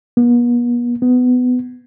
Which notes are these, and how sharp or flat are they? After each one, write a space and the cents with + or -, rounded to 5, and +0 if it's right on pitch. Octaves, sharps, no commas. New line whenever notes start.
B3 -40
B3 +20